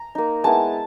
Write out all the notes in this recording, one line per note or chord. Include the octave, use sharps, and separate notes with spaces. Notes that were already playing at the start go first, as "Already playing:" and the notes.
Already playing: A#5
A#3 D#4
G#3 B3 E4 A5